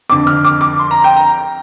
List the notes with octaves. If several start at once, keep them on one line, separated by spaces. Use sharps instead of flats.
F2 D3 D6
F6
D6
D6
C6
A#5
G5
A#5